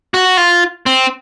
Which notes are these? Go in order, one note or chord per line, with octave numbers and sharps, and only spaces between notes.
F#4
F4
C4